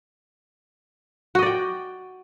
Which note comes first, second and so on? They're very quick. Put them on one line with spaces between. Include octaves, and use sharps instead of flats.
F#4 D#5 D5 G5